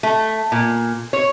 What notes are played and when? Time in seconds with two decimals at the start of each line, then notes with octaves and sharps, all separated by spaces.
0.03 A3
0.52 A#2
1.13 C#5